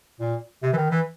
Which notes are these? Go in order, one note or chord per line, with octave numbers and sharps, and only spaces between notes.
A#2
C3
E3
D#3
E3